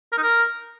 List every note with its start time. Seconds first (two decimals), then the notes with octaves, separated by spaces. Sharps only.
0.12 A#4
0.18 D#4
0.23 A#4